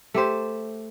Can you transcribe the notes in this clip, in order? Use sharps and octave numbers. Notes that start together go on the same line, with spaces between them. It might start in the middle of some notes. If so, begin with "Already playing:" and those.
A3 G4 C5